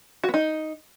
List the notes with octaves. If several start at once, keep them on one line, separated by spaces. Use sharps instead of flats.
F#4
B3
D#4